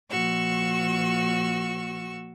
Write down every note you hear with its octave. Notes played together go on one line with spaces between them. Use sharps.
A#2 F3 F#4 C#6 E6